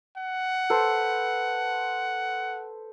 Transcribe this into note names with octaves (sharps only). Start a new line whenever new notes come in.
F#5
A4 B4 C5